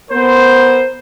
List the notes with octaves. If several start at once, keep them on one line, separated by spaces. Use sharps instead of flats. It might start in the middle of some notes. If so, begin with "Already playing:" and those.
B3 A#4 C5